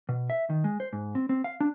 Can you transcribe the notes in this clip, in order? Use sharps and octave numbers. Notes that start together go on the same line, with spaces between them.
B2
E5
D#3
G#3
C5
G#2
C4
C4
F5
D4